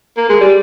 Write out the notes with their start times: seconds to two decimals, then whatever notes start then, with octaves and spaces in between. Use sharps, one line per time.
0.17 A#3
0.29 G#3
0.41 G3